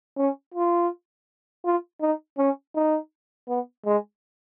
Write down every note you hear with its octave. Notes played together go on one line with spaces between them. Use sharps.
C#4
F4
F4
D#4
C#4
D#4
B3
G#3